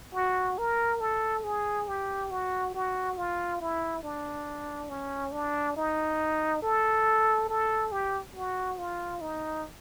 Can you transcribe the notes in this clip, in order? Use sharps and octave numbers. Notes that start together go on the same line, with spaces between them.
F#4
A#4
A4
G#4
G4
F#4
F#4
F4
E4
D4
C#4
D4
D#4
A4
A4
G4
F#4
F4
D#4